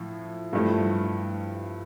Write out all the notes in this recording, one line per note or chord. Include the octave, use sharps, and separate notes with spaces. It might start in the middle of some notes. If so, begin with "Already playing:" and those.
Already playing: A2 F3
G2 F3 A3 E4